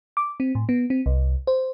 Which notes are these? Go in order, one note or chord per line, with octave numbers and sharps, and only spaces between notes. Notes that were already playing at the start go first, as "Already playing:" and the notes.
D6
C4
A2
B3
C4
C2
C5